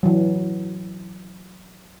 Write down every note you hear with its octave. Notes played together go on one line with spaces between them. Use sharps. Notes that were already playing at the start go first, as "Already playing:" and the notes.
E3 F#3